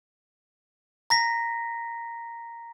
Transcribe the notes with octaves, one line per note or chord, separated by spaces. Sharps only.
A#5 A#6 B6